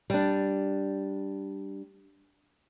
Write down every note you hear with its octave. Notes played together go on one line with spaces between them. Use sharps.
G3 D4